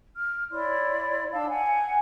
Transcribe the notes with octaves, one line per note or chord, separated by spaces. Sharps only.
F6
E4 C#5 D5 C6
D4 F5 A5 E6
F#5 G#5